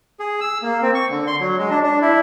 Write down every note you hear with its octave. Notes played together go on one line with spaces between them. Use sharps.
G#4
E6
A#3
C4
C#6
D3
C6
F#3
G#3
D4
D4
E4